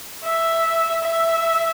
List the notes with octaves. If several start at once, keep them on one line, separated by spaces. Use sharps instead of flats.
E5
E5